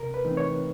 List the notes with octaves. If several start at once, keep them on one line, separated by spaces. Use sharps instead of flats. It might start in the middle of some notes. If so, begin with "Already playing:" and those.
Already playing: C3 A#4
B4
E3 A3 C4 D#4
C#5